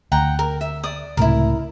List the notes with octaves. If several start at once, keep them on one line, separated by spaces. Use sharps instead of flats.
D2 F#5 G5 A#5
A#4
E5
D5 D#6
C#2 A2 C3 E4 A#4